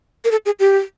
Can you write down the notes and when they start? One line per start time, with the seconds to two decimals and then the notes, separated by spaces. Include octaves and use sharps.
0.25 A#4
0.31 A4
0.46 G#4
0.60 G4